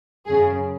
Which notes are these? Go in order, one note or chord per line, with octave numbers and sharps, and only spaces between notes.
F#2 C#3 G#4